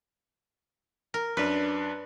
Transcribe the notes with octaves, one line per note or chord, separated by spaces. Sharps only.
A#4
F#2 D4 B4